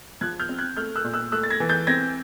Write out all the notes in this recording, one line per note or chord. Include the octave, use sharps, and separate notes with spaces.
F3 F#6 G#6
F6 G6
C4
F#6 G#6
A3 F6 G6
E6 F#6
A#2
E6 F#6
A3 E6 F#6
A6
G#6 A#6
E3
G6 A6
C4 G#6 A#6